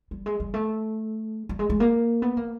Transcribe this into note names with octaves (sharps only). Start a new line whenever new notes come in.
G3
G#3
G3
A3
G3
G#3
G#3
A#3
B3
A#3